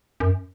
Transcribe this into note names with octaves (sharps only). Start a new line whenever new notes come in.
F#2